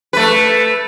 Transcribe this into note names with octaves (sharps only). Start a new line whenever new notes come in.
A3 B4